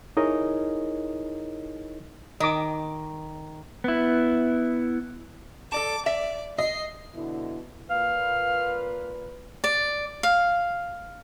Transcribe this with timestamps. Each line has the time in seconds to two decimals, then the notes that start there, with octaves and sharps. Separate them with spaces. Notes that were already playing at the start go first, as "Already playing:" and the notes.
0.17 D#4 E4 G#4 A#4 C#5 D#5
2.40 D#3 D#5 D6
3.84 B3 E4
5.72 A4 D5 A5 D6
6.06 D5 E5
6.58 D#5 C7
7.14 B2 D3 E4
7.90 A#2 B4 F5
9.64 D5
10.23 F5